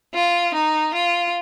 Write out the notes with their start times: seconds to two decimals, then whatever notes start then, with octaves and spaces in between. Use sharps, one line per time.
0.14 F4
0.55 D#4
0.95 F4